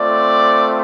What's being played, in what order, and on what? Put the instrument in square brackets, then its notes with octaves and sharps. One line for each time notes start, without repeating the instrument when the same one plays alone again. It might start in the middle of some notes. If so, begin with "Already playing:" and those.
Already playing: [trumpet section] A3 C4 F4 D5